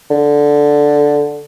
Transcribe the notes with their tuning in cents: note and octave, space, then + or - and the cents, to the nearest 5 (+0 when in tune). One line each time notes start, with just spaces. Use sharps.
D3 -5